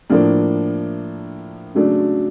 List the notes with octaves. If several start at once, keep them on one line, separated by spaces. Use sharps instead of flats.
A2 F3 A#3 D4
C#3 F#3 A3 D4